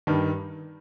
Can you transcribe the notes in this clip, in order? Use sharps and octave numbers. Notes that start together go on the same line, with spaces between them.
G2 D#3 G3